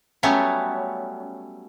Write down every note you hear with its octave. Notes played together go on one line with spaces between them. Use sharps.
F#3 G3 A3 B3 C#4